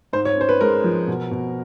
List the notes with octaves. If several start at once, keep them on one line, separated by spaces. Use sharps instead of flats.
G#2 C5
C#5
C#4 C5
B4
G#3 A#4
F3
B2
B2